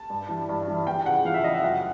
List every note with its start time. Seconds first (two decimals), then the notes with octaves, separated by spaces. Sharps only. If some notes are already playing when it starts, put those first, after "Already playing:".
Already playing: A5
0.10 G2
0.29 E3 G3
0.49 G2
0.68 E3 G3
0.87 E2 G5
1.06 C#3 F3 F#5
1.25 E2 F5
1.34 E5
1.44 C#3 F3 D#5
1.54 E5
1.63 F#2 F#5